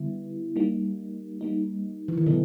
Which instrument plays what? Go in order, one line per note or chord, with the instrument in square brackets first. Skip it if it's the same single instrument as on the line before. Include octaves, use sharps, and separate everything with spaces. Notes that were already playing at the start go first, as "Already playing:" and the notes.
Already playing: [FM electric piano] D3 G3 B3 E4
G3 A#3 D#4
G3 A#3 D#4
[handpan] E3
D#3
[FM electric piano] B2 F#3 B3 D#4 [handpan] D3